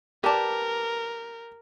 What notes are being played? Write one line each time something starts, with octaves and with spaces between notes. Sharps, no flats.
G4 A#4 B4 D5 A5